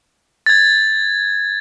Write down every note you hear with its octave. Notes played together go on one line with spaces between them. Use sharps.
G#6 A6